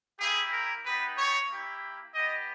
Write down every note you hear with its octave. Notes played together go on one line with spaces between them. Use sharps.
A#3 E4 G4 G#4
A#4
B3 D#4 G4 B4
C#5
A#3 E4 G4
B3 G4 D#5